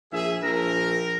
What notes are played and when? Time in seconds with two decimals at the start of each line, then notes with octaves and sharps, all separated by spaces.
0.12 A#1 G#4 E5
0.43 A#1 A#4 A#6